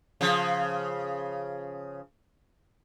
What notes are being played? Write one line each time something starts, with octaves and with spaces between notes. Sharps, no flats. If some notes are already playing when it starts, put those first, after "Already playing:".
C#3 F3